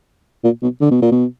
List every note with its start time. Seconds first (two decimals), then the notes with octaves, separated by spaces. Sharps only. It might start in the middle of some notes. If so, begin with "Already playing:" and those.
0.44 A#2
0.62 B2
0.81 D3
0.91 B2
1.02 A#2
1.12 B2